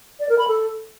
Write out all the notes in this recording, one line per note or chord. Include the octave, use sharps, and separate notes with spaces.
D5
A#4
B5
A4